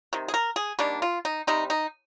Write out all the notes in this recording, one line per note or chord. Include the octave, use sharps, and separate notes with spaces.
C3 D#3
G#4
A#4
G#4
D#3 G3 A#3 D4
F4
D#4
C3 G3 C4 D#4
D#4